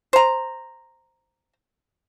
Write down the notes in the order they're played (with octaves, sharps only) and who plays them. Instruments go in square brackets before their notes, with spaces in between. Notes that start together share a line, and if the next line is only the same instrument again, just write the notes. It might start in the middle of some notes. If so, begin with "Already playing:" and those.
[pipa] C5 A#5